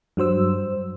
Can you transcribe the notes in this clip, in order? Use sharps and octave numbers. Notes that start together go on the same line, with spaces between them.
G2 F#3 C5 E6